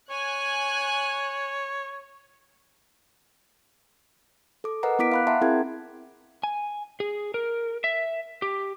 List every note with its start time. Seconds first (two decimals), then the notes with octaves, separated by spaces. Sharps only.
0.10 C#5 G#5 F#6
4.64 A4 D6
4.83 A#4 B4 D#5 F#5 A#5
4.99 B3 E4 D6 B6 D7
5.12 F5 B5 F#6
5.27 E5 F#5 A5 A#5 C6
5.41 C4 E4 G#4 A#4 G5 G#6
6.43 G#5
7.00 G#4
7.34 A#4
7.84 E5
8.42 G4